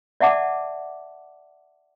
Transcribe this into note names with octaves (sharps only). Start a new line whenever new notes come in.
D5 E5 F#5 A5 D6